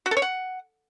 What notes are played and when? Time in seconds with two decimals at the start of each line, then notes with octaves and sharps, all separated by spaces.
0.06 F#4
0.11 A4
0.17 C#5
0.22 F#5